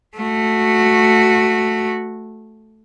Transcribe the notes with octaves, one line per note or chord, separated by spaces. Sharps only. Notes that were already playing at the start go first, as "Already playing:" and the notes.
A3 F#4